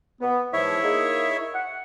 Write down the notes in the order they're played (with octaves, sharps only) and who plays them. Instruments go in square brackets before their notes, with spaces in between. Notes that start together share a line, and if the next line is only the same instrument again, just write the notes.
[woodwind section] B3
[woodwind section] E2 G#2 F3 [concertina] E4 C#5 E5
[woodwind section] A#3 D#4 G#4
F#5